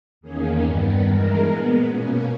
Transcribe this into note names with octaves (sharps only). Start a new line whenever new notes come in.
E2 D#3 A#3 C#4 G#4
G2 D#3 G3 B3
G2 E3 G#3 A#4
A#2 G#3 B3
B2 A#3 C#4